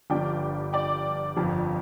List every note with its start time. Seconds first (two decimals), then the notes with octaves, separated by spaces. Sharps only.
0.10 G1 G2 F3 D5 G5
0.73 D5 G5
1.36 G1 F2 F3